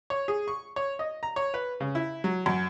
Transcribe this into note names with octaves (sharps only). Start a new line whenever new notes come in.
C#5
G#4
C#6
C#5
D#5
A#5
C#5
B4
C#3
E4
F#3
F#2